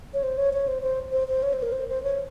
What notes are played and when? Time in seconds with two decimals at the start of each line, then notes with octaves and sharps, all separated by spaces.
0.14 C#5
0.23 C5
0.38 C#5
0.53 C#5
0.67 C5
0.83 C5
1.12 C5
1.28 C5
1.43 C#5
1.53 C5
1.62 A#4
1.72 C5
1.88 C5
2.03 C#5